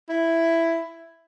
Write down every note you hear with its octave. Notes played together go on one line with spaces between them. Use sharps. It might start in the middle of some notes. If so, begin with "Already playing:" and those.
E4